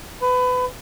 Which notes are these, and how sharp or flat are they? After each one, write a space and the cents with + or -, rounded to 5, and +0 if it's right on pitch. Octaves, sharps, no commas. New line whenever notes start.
B4 +25